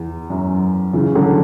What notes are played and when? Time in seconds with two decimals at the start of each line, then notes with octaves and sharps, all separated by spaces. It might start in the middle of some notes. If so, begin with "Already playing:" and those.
Already playing: E2
0.30 F#2
0.93 C#3 E3
1.15 D3 F#3